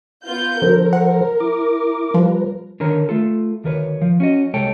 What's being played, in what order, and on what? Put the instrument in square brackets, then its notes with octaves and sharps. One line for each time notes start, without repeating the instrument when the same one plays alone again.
[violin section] B3 F4 G6
[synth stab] D3 F#3 [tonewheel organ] F3 A4 C5 [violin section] A#4
[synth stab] F#5
[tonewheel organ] E4 D6
[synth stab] F3 [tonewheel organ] G3 B4
[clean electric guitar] D3 D#3 A#4 C#5 A#5
A3 F4 A4
D2 D#3 A#4 B4 C#5
F3
C#4 F#4 D#5
C2 G#3 A4 C#5 G5 A5